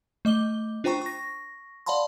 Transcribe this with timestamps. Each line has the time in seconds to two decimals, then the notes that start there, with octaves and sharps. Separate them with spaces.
0.25 A3 D#5 D6 G7
0.84 D4 F4 C5 G5 A#5 C#6
1.02 C#6 A#6
1.86 D5 F5 F#5 A5 B5 C6